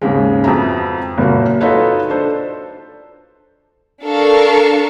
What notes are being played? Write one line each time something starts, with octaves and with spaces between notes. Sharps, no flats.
D#2 G#2 C#3 G#3
F2 B3 F#4 E5 A#5
F#1 A#2 A#3 F#4
D#4 F4 F#4 A4 B4 C#5
D4 A4 C5
D4 A4 A#4 F5 C#6